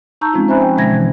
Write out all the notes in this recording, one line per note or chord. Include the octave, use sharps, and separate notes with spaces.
D#4 A5 A#5 C#6 E6 G6
F3 G#3 C4 C#4 D#4 F4
C5 E5 G#5 A#5 B5 F#6
G5
B2 D3 G#3 E5 G#6 A#6
E3